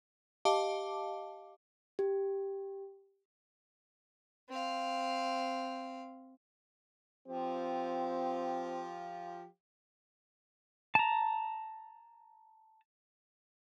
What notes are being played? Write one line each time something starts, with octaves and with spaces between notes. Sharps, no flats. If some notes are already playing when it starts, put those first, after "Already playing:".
G4 D#5 F5 A5 D6
G4
C4 F5
F3 C4 F4 G4
A5 A#5